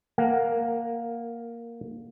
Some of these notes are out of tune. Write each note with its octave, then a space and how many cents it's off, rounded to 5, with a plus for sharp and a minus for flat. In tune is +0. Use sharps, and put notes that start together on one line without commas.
A#3 +0 A#4 -20 F#5 +0